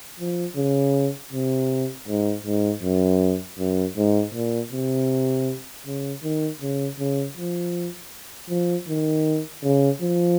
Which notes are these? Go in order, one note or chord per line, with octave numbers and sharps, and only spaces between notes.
F3
C#3
C3
G#2
G#2
F#2
F#2
G#2
A#2
C3
C#3
D#3
C#3
C#3
F3
F3
D#3
C#3
F3